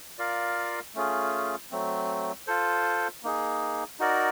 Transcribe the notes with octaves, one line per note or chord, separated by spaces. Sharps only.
F4 A#4 D5 F5
A3 C#4 F4 G#4
F#3 A3 C4
F4 A4 C5
A#3 D#4 G#4
D#4 F#4 A#4 D5